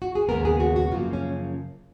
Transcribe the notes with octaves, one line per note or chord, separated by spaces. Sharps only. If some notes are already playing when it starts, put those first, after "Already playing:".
F#4
G#4
D#2 C#3 G#3 B3 A#4
G#4
F#4
F#4
F#2 C#3 F3 A#3 F4
C#4